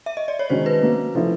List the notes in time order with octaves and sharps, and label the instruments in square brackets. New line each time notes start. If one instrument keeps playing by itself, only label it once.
[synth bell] E5
D#5
D5
C#5
[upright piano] D#3 G#3 C#4 F#4 [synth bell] C5
[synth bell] B4
[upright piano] F#3 A#3 C#4
F3 A3 C#4 E4